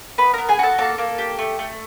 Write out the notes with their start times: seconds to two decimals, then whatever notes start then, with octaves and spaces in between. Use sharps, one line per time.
0.18 B3 B4 B5
0.33 B3 A#4 A#5
0.49 G#4 G#5
0.59 F#4 A4 A5
0.78 A#3 A4 A5
0.98 A#3
1.18 G4
1.39 A3
1.59 A3